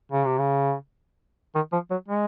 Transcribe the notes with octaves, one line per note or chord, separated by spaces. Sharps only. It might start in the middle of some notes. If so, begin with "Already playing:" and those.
C#3
C3
C#3
D#3
F3
F#3
G#3